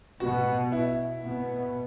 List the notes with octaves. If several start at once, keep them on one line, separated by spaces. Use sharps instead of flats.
B2 B3 F#4
E4
B2 B3